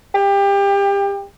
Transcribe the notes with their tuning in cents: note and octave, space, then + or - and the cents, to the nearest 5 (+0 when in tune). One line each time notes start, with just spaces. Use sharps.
G4 +25